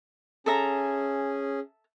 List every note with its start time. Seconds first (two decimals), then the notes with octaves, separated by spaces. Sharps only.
0.46 C#4 G#4 A4 E5 A#5